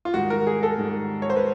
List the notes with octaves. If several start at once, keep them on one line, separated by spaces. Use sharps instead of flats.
F4
G#2 D#3 G3 F#4
A#4
G#4
A4
G#2 D#3 G3
C#5
C5
B4